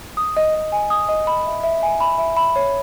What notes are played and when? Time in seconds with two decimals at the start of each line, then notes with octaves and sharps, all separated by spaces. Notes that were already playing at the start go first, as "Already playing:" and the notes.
0.17 D#6
0.37 D#5
0.55 D#5
0.72 G#5
0.90 D#6
1.09 D#5
1.27 B5
1.46 E5
1.64 E5
1.83 G#5
2.00 B5
2.18 E5
2.37 B5
2.56 C#5